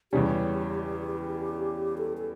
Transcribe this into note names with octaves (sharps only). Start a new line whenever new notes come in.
E2 C#3 G3 C#4 G4
A4
A4